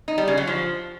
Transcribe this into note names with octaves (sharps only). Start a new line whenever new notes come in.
D#4
G3
C#3
F#3
F3